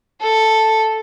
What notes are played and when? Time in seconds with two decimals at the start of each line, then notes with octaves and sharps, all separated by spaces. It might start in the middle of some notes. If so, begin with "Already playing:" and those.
0.22 A4